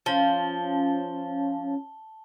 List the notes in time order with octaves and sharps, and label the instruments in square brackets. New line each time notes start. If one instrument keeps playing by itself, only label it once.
[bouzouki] F3 [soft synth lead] C#4 [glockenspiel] A5 G7